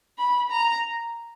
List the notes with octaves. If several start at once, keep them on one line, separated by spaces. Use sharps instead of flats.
B5
A#5